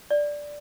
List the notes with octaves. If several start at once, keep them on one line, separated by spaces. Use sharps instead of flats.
D5